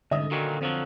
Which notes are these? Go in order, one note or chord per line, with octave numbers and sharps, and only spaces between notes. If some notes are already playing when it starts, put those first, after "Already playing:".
C2 G#2 D3 D#5 E5 D#6
A#2 D#3 F#3 F#4
F2 F3 F#3 C4